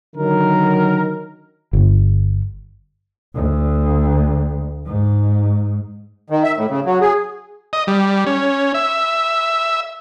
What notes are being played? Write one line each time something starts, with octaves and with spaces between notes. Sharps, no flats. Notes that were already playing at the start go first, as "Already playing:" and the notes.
D3 D#3 F#3 A#4
G1
D2
G#2
D#3
E5
A2
C#3
F#3
G#4
D#5
G3
C#4
E5